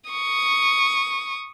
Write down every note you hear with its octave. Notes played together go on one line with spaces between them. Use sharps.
C#6 D#6